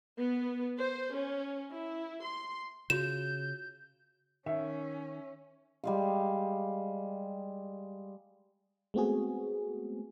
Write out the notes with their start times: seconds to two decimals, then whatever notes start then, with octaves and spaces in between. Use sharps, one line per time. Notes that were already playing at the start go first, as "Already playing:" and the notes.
0.16 B3
0.77 C5
1.12 C#4
1.71 E4
2.24 C6
2.90 C#3 F4 F#4 C6 G6 E7
4.46 D#3 C#4 E5
5.84 G3 G#3 F5
8.94 G#3 A3 B3 C4 F#4 G#4